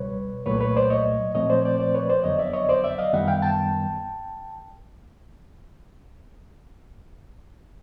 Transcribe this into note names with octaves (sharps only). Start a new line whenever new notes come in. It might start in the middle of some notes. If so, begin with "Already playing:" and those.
Already playing: C#2 B2 G3 B4 C#5
C2 A#2 F#3 A3 B4 C#5
B4 C#5
C5 D5
C#5 D#5
A#2 F3 A3 C4 C#5 D#5
C5 D5
C#5
C5 D5
C5 D5
B4 C#5
C5 D5
F2 D3 F#3 B3 C#5 D#5
D5 E5
C#5 D#5
C5 D5
D5 E5
D#5 F5
F#2 D#3 G3 B3 E5 F#5
F5 G5
G5 A5